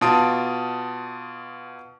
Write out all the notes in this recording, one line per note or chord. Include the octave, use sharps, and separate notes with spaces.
B2 F4 A5 D#6 D7